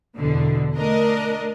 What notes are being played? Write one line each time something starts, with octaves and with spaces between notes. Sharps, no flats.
E2 B2 D3
A3 D4 A#4 D#5